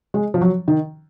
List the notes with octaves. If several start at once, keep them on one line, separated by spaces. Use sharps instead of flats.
G#3
F3
F#3
D#3